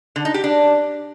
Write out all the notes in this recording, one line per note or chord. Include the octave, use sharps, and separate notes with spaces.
D3
D#4
G4
D4